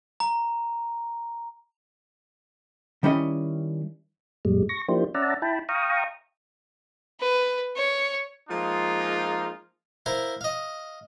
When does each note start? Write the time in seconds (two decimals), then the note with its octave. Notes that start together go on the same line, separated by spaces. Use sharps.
0.20 A#5
3.03 D#3 G3 C#4 E4 D#5
4.45 F#2 A#2 G3 G#3
4.69 C#6 A#6
4.88 F3 A#3 D4 E4 G4 C5
5.14 C#4 D5 E5 F#5 A5 A#5
5.42 E4 G5 A5 B5
5.69 F5 G5 A#5 C#6 D#6
7.20 B4
7.76 C#5
8.49 F3 G#3 A#3 D#4 F4
10.06 E4 A#4 C5 F5
10.41 D#5 F5